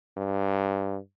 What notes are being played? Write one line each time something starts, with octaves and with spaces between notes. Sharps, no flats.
G2